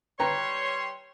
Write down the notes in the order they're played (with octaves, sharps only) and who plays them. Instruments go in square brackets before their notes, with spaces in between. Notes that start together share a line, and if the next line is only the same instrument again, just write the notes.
[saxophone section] G3 C#5 [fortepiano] B4 G5 A#5 [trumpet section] C6